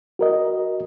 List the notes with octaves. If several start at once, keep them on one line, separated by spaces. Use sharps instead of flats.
F#4 A#4 D#5